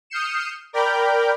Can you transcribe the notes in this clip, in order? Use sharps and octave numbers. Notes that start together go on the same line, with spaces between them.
D#6 F6 G6 C7 C#7 E7
A#4 D5 G5 B5 F6 G6